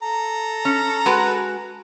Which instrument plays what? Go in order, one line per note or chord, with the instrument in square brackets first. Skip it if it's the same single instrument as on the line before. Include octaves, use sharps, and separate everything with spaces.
[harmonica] A4 A#5
[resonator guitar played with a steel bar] C#4
G#3 F#4 B4